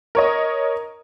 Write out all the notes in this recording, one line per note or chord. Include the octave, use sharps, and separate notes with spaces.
A#4 C#5 D#5